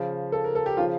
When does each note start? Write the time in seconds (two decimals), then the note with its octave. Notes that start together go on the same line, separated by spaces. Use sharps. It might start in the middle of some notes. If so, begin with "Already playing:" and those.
Already playing: C#3 F3
0.32 A4
0.44 A#4
0.55 A4
0.66 G4
0.77 C#3 F3 F4